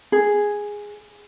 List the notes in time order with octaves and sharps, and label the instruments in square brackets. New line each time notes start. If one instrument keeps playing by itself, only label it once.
[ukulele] G#4